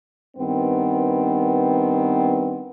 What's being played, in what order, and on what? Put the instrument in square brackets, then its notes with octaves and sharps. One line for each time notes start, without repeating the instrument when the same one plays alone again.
[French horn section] G2 D#3 B3 C4